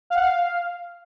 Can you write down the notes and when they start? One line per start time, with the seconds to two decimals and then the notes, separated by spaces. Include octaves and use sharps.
0.10 F5
0.15 F#5
0.20 F5